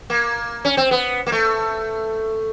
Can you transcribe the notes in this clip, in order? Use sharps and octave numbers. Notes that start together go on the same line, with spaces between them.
A#3
C#4
C4
B3
A#3
A3